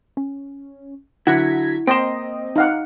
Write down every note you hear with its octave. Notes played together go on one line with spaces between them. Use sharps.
C#4
D3 F#3 E4 F#5 G#6 A#6 B6
A#3 C4 C5 D#5 G5 C6 A#6 E7
D#4 F5 F#5